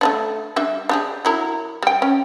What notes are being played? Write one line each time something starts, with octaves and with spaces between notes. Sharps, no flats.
A3 C#4 D4
G3 D4 E5
D4 G4 G#4
F#3 E4 A#4
G3 G5
C#4